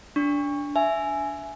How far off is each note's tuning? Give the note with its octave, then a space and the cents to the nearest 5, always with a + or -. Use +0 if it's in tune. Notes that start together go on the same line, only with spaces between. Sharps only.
D4 -20 C#6 +0
E5 +10 G#5 +10